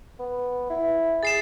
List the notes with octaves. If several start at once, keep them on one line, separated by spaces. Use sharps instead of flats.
B3
E4
G#4 A6 C7 E7